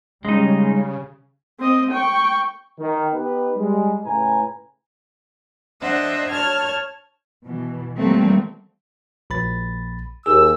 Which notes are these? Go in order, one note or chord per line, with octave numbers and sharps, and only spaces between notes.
C#3 G3 G#3 C#4 D#4
C4 D#5
G5 C#6
D#3
B3 D#4 G4 B4
G3 G#3
A2 C#3 B4 G#5 A#5
D4 C5 D#5 E5 F#5
C#5 A5 F6 G#6
B2 E3
E3 F#3 G3 A3 A#3 C4
A#1 B5 A6
D#2 G#4 E6